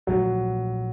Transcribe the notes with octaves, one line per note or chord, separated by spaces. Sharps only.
A#2 F3 F#3 A3